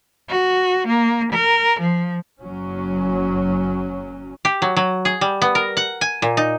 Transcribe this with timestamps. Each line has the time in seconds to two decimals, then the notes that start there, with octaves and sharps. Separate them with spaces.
0.29 F#4
0.87 A#3
1.32 A#4
1.80 F3
2.39 F#1 F#3 C#4
4.45 G4
4.62 F#3
4.77 F#3
5.05 G#4
5.21 G3
5.42 B3
5.55 A#4
5.77 F#5
6.01 G#5
6.22 A#2
6.37 D#4